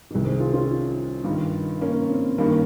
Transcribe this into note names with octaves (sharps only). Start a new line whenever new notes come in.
C2 C3 D#3
G#4 C5
F4 G#4
C#4 F4
G2 D#3
A#3 C#4
C4
G2 D#3 A#3 C#4